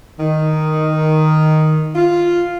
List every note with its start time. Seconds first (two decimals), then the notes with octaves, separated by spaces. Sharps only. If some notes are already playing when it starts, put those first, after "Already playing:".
0.20 D#3
1.95 F4